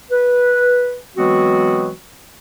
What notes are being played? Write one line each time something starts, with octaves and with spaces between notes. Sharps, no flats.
B4
E3 F#3 G#3 B3 C4 F#4